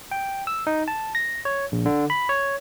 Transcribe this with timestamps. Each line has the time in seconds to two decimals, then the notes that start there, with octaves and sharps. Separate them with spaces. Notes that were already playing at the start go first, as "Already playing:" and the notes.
0.11 G5
0.47 E6
0.67 D#4
0.88 A5
1.15 A#6
1.45 C#5
1.72 A#1
1.86 D3
2.10 B5
2.29 C#5